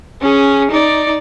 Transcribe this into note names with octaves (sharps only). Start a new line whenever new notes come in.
C#4 G#4
D#4 D5